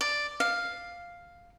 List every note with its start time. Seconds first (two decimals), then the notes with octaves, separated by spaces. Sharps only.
0.01 D5
0.40 F5